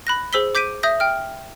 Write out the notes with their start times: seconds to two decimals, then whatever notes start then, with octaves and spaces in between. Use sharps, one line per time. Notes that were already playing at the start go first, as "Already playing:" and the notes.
0.07 B5 F#6 A#6
0.33 G#4 C5 E6 B6 G7
0.55 D6 G6 B6 D7 D#7
0.83 E5 D#6 G6 A#6
1.00 G5 F6